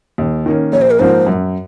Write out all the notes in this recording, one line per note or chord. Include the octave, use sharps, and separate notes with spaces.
D#2
D#3 A#3 C#4
A#1 C#5
C5
A#4
G#2 F3 A#3 C5
F#2